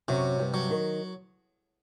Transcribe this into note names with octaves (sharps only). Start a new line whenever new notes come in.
F#2 C3 F#3
G2 G3
F#3
D#3